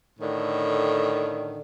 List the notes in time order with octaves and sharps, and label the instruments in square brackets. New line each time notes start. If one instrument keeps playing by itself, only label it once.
[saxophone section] A2 D3 D#3